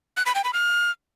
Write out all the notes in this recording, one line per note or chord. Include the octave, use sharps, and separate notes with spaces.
F#6
B5
G5
B5
F6